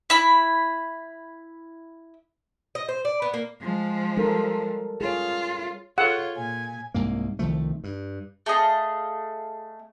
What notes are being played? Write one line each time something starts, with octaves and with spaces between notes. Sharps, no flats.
E4 B5
D#5
C5
D5
B3
A#3
F3 G#3
G3 A4 A#4
F4 G#4 C#5
F4 G#4 A4 C#5 F#5
A#2 G#5
C2 G#2 A#3
C2 D#3 F3 A3
G2
A3 G#4 D#5 F5